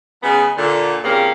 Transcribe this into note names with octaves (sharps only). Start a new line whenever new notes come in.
C#3 F#3 G#3 B3 G#4
A#2 D3
G2 A#2 C#3 A#3 C4